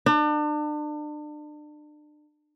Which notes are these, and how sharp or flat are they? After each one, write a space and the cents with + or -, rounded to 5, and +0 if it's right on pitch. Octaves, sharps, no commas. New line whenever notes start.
D4 +35